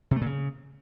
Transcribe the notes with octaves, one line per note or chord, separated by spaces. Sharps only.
C3
A3
A#2
C#3